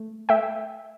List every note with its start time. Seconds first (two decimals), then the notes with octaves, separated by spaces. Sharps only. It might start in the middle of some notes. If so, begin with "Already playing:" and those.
Already playing: A3
0.29 A3 E5 G5